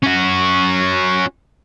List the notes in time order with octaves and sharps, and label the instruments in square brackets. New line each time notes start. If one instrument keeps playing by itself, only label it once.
[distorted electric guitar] C#4 F#4